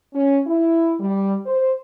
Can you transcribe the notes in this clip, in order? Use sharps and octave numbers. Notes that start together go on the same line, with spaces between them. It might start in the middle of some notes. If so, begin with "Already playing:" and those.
C#4
E4
G3
C5